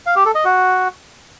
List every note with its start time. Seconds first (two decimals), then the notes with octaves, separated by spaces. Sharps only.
0.06 F5
0.16 G4
0.25 A4
0.35 D#5
0.44 F#4